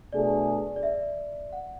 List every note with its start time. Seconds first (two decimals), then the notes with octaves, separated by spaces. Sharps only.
0.13 B2 A3 D4 G#4 D5
0.76 D5
0.83 E5
1.53 F#5